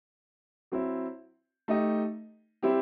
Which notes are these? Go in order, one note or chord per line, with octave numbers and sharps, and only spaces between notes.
F#3 C4 E4
A3 D#4 G4 D#5
G3 C4 E4 G4